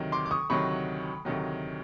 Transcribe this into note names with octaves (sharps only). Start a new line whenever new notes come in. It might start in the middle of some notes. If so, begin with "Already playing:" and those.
Already playing: D2 C3 D#3 F#3
C6 D6
D6
C#6 D#6
D2 C3 D#3 F#3 B5 C#6
D2 C3 D#3 F#3